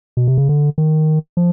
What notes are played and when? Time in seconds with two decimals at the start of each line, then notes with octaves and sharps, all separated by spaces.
0.17 B2
0.28 C3
0.38 C#3
0.49 D3
0.78 D#3
1.37 F3